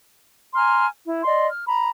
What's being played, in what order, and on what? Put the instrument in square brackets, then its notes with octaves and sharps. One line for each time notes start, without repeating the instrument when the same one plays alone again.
[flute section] G#5 A#5 C6 F6
E4
D5 D#5 C6
F6
A#5 B5